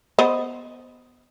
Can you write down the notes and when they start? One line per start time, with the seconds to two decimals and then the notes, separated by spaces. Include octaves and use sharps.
0.19 B3 C5 D#5